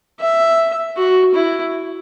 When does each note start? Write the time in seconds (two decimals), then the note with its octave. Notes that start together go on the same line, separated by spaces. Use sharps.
0.20 E5
0.97 F#4
1.35 E4